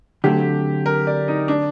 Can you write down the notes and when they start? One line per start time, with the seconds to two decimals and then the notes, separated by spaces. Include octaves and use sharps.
0.24 D3 F#3 A3 C4 G4
0.86 A#4
1.07 D5
1.28 D#4
1.48 D4